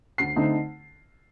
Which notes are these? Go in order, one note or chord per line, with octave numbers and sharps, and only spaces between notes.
D2 C7
D3 A3 C4 D#4